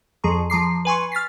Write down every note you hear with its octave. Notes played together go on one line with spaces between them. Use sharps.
F2 F3 G#4 A#5 C#6
F3 A#5 D6 C7
B4 G#5 C6 C#6
F6 A6 B6 C7